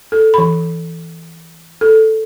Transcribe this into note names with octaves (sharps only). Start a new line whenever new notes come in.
A4
E3 B5
A4